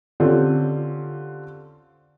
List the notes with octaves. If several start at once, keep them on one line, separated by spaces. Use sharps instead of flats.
D3 C4 C#4 F4 G4